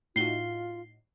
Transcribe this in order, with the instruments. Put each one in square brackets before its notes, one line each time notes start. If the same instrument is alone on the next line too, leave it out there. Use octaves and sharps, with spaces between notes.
[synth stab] A2 D#4 F#4 [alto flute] F4 [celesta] C7 G7